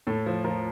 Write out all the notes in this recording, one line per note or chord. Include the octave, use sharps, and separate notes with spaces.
A2 A4
F3
F3 A#4